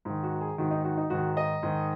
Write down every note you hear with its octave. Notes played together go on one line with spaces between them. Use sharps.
G#2 D#3
F#4
G#4
G#2 D#3 F#4
D#4
F#4
D#4
G#2 D#3 F#4
D#5
G#2 D#3